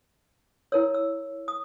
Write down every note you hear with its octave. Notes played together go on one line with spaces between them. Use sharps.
E4 A#4 C#5 E6
E6
D#6